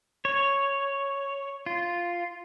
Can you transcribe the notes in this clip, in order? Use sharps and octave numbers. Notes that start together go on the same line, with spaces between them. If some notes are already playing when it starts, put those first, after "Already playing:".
C#5
F4